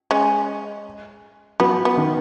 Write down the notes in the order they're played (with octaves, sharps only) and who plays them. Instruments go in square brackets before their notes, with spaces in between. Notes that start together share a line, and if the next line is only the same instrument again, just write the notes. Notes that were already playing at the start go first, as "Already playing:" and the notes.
[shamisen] G#3 C#4
[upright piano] F#3 [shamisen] B3
[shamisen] B3
[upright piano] D#3